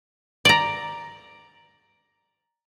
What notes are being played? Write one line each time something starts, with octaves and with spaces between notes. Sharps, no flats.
D5 A#5